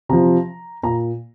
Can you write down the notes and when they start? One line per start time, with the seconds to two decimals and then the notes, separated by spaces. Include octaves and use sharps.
0.09 C3 F3 A#5
0.83 A#2 A#5